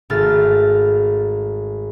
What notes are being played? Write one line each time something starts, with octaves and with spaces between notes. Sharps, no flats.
G#1 A3 F6 A6